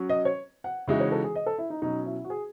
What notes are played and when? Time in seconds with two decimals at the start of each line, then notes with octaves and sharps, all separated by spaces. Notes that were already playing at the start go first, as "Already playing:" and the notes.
Already playing: F#3 C#4 F#4
0.09 D#5
0.25 C#5
0.64 F#5
0.87 C#3 E3 G#3 D#4 F#4 E5
1.00 C#5
1.12 A4
1.24 G#4
1.35 D#5
1.46 A4
1.58 E4
1.70 D#4
1.82 B2 F#3 C#4 D#4
2.06 E4
2.25 F#4
2.30 G#4